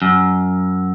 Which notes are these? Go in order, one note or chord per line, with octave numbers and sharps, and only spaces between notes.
F#2